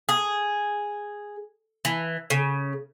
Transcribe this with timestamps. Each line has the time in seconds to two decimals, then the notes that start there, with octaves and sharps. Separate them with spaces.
0.09 G#4
1.85 E3
2.30 C#3